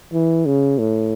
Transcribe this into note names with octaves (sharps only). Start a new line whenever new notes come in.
E3
C#3
A2